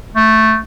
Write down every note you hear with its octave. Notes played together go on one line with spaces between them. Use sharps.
A3